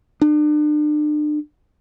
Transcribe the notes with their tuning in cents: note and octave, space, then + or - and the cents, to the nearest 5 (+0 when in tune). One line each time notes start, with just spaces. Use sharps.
D4 +40